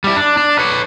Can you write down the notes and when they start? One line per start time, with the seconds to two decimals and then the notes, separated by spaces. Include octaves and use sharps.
0.04 G3 E4
0.17 D4
0.37 D4
0.59 B4 C#5